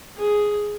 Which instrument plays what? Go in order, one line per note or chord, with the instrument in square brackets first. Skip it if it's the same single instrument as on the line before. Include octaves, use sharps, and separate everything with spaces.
[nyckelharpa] G#4